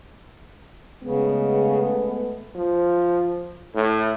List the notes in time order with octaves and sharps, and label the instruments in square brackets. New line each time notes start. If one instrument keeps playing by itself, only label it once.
[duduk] C#3 [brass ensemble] G#3 A3 B3
[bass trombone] F3
A2